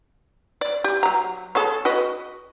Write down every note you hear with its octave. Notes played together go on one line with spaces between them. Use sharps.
D5
G4
F#3 A#5
G#4 A4 C#5
F#4 B4 D#5